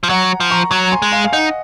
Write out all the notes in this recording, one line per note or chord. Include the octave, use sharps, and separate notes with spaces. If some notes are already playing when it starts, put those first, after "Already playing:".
F3
F#3 F#5 A#5
F3
A#5 C#6
F#3 A#5 C#6
G#5 C6
G#3
F5 G#5
F5
D#4 D#5 F#5